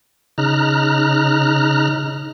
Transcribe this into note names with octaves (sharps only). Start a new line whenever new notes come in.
C#3 D#4 A#5 F6 F#6